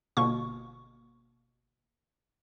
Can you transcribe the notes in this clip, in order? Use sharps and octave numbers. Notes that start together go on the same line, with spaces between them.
G1 B2 A#3 C#6